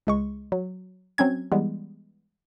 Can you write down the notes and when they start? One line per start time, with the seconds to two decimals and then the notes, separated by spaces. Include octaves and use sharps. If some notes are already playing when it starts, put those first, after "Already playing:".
0.07 C#2 G#3 C#6
0.52 F#3
1.18 F#3 C4 C#4 G#6
1.52 E3 G3 G#3 B3